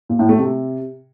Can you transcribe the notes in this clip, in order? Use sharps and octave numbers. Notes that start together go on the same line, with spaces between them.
A#2
A2
A3
C3